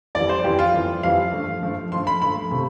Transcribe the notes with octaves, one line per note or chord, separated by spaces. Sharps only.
F2 E3 G3 D5
C5
F2 E3 G3 G4
F4
F2 E3 G3
F2 E3 G3 F5
G2 F3 A3
G2 F3 A3
G2 F3 A3 C6
B5
G2 F3 A3 B5
C3 F3 A3